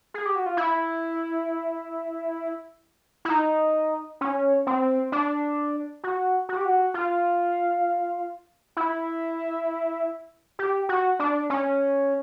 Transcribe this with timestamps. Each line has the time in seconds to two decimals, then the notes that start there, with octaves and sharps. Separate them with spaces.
0.14 G#4
0.26 G4
0.35 F#4
0.46 F4
0.57 E4
3.25 E4
3.30 D#4
4.21 C#4
4.67 C4
5.12 D4
6.04 F#4
6.49 F#4
6.57 G4
6.65 F#4
6.94 F4
8.77 E4
10.59 G4
10.89 F#4
11.19 D4
11.50 C#4